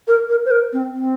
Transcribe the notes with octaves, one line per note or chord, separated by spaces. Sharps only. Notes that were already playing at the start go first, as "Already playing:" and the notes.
A#4
A#4
C5
A#4
C4
C4